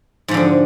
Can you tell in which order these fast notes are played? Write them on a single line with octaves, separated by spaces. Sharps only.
G#2 F3 D3 F2